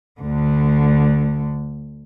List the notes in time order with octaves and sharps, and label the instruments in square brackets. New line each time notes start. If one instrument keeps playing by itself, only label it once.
[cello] D2 D3